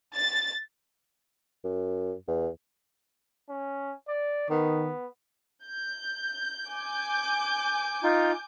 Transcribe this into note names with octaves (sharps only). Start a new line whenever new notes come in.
A6
F#2
E2
C#4
D5
D#3 B3
G6
G#5 D6 G6
D#4 F4